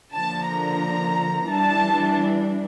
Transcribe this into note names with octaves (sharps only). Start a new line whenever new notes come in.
D3 F3 A#3 D4 A5
A#5
E3 G3 D4 A5